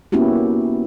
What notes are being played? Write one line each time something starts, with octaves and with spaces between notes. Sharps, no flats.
A#3 B3 C#4 E4 F#4 G4